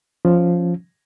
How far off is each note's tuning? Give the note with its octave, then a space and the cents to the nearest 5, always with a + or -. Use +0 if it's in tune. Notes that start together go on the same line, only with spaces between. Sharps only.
F3 +0 C#4 +0